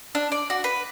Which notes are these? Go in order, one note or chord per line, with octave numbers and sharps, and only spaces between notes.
D4
D5
F#4
B4